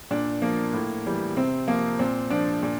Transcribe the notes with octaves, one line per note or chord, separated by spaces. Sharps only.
A#2 D4
F3 A#3
A2
E3 G3
C3 C4
F3 A#3
A#2 C4
F3 D4
A#2